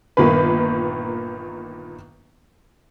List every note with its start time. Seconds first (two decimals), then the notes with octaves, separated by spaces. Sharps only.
0.17 G1 A#2 D#3 A#3 B4